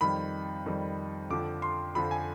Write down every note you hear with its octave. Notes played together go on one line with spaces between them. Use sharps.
F2 D#3 G3 B5
F2 D#3 G3
F2 D3 F3 D6
C6
F2 D3 F3 B5
G#5